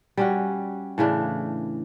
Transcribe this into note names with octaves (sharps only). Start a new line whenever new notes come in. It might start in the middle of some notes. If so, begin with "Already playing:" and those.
G3 C#4 F#4
A2 C#3 E3 D4